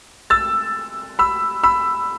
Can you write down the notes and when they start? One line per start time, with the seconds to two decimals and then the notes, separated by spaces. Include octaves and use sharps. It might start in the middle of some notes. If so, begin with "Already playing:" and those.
0.30 E6 A6
1.19 B5 E6
1.63 B5 E6